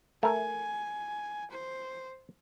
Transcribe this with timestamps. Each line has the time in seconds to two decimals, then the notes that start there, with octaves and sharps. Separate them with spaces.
0.23 A3 A#4 G#5
1.50 C5